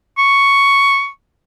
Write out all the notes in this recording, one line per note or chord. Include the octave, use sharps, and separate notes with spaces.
C#6